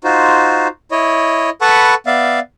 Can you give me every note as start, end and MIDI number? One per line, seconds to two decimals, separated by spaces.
0.04 0.68 63
0.04 0.68 65
0.04 0.68 66
0.04 0.68 72
0.91 1.50 64
0.91 1.50 73
0.91 1.50 75
1.61 1.94 69
1.61 1.94 71
1.61 1.94 78
1.61 1.94 81
1.61 1.94 83
1.61 1.94 85
2.06 2.39 59
2.06 2.39 74
2.06 2.39 76
2.06 2.39 77